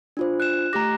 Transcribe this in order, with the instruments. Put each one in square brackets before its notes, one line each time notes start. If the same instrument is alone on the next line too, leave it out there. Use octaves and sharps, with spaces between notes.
[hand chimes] D4 F4 C5
[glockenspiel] F#6 E7
[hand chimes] A3 G4 A#6 [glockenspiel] A#5 D6